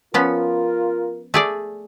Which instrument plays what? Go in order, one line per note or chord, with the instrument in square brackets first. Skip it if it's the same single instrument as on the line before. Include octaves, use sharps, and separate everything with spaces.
[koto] F3 B3 C#4 [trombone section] F4 A#4
[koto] A3 G#4 D5